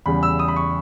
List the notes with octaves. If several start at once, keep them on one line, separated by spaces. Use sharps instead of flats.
E2 C#3 G3 B5
E6
D#6
B5
C#6